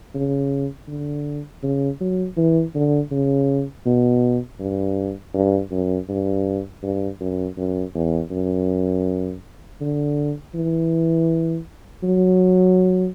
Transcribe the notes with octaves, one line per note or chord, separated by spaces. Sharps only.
C#3
D3
C#3
F#3
E3
D3
C#3
B2
G2
G2
F#2
G2
G2
F#2
F#2
E2
F#2
D3
E3
F#3